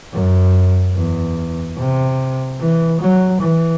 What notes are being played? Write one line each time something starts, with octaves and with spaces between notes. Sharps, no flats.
F#2
E2
C3
E3
F#3
E3